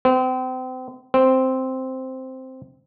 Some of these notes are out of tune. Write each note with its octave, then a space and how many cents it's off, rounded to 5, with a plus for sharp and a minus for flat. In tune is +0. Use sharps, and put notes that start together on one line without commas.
C4 -35
C4 -5